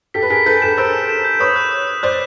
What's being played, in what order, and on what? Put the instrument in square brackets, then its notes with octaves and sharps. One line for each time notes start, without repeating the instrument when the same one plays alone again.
[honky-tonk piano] G4 A4 [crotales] B6
[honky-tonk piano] B4
[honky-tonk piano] G#4 A#4 [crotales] B6
[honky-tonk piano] A4 B4 [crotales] G6
[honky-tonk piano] A4 B4 [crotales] E7
[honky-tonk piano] A#4 C5 [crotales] E6
[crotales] E7
E7
G6
[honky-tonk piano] B4 C#5 [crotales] D#6
[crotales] F#6
D#6
D#6
[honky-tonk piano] C5 D5 [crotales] F#6